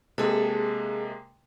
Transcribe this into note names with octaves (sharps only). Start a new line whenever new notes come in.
C3 G#3 A#3 G#4 A4